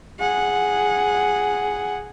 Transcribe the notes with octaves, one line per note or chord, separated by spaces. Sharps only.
G#4 F#5